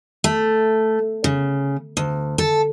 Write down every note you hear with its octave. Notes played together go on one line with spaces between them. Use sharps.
A3
C#3
D2
A4